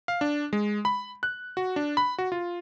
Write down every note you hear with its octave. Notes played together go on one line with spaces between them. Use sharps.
F5
D4
G#3
B5
F#6
F#4
D4
B5
F#4
F4